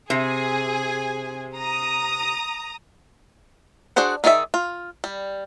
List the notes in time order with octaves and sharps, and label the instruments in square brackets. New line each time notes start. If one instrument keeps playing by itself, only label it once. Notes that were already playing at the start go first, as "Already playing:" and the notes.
[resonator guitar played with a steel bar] C3 [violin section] G#4 G#5
[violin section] A#5 D#6
[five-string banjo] D4 F#4 G#4 C5 F#5
D#3 D#4 G#4 D5 E5
F4
G3